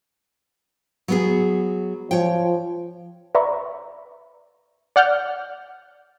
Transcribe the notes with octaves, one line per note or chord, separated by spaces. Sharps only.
F#3 B3 G#4
F3 C#5 G5
B4 D5 E5 A#5 B5 C#6
D5 F#5 F6 G6